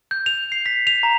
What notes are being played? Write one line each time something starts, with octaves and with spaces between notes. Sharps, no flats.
G6
F7
C7
B6
F7
A#5